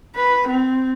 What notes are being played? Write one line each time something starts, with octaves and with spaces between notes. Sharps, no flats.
B4
C4